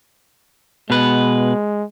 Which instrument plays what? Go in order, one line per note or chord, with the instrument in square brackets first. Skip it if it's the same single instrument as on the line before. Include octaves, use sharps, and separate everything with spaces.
[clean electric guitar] B2 B4 [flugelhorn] G#3